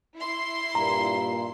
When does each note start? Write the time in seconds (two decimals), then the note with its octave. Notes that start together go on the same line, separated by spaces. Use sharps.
0.16 E4 C6
0.75 G2 A#2 A#5